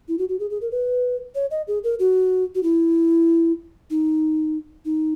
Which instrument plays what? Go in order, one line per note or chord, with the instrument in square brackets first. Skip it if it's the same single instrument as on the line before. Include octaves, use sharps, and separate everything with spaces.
[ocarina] E4
F#4
F#4
G#4
G#4
A#4
B4
C#5
D#5
G#4
A#4
F#4
F#4
E4
D#4
D#4